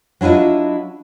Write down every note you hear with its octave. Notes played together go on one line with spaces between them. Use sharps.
F#3 D4 E4 F4 D#5